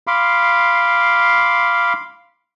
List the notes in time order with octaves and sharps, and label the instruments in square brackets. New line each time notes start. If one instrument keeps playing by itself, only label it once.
[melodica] F5 B5 C6 D6